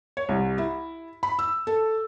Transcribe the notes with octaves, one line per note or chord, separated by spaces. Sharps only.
C#5
C2
E4
B5
E6
A4